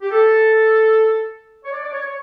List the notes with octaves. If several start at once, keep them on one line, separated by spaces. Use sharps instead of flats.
G4
A4
C#5
D5
D5
C#5
C#5